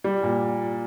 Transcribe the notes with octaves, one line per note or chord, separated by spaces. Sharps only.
G3
A#2